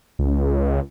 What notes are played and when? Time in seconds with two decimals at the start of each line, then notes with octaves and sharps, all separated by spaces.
0.19 C#2